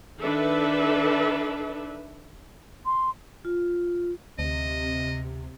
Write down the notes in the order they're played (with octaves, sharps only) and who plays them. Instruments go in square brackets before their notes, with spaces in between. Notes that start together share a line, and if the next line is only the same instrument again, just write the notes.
[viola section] D#3 D4 A4 B4 E5
[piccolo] C6
[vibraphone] F4
[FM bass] D2 [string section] C3 [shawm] D#5